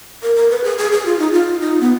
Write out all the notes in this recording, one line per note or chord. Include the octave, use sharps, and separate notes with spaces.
A#4
A#4
B4
G#4
G#4
G#4
F4
D#4
F4
D#4
B3